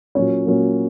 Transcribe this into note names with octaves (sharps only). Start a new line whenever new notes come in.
A#2 F#3 A#3 C#4 C#5
A#2 F#3 A#3 C#4